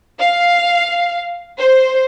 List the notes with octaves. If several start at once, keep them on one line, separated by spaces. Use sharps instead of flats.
F5
C5